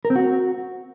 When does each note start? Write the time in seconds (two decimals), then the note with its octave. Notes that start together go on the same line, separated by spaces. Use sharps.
0.05 A#4
0.10 C4
0.16 F#4